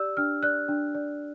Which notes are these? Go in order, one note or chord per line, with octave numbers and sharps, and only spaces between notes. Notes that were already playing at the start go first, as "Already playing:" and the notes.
Already playing: G4 D5 E6
D4 F6
D5 F#6
D4
D5